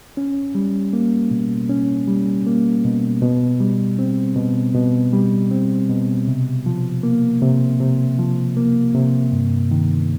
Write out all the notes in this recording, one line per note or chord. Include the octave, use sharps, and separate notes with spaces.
C#4
G3
A#3
B2
C#4
G3
A#3
B2
B2
G3
C4
B2
B2
G3
C4
B2
C3
F3
A#3
C3
C3
F3
A#3
C3
G2
D#3